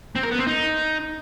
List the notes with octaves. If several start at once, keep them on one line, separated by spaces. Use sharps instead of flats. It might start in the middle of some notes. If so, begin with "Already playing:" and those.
C4
A#4
B3
C4
D#4